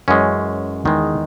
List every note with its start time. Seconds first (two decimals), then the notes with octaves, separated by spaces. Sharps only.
0.08 F#2 E3 G#3 C#4
0.85 E2 D#3 G#3